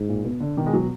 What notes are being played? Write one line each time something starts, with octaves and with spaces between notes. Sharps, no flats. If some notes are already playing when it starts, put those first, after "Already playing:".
Already playing: G#2
A#2
B2
D3
B2 D#3
G#3
F#3